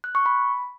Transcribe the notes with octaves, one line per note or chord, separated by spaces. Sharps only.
F#6
C#6
B5